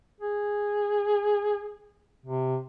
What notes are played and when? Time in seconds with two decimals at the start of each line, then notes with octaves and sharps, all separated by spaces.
0.20 G#4
2.26 C3